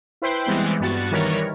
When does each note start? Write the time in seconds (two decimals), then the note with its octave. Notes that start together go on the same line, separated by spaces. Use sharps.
0.22 E4 B4 C5 G5 C6
0.46 E3 G3 G#3 B3 C4 E4
0.80 G2 B3 F#4 A6
1.11 D#3 E3 G3 A#4 B4 C#5